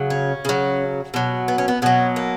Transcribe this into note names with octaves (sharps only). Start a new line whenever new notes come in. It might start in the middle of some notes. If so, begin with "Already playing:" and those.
Already playing: C#3 F#3
C#4
C#3 F#3
B2 F#3
B3
C#4
B3
B2 F#3 C#4
A#3